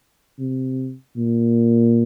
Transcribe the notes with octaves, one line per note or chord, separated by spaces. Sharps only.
C3
A#2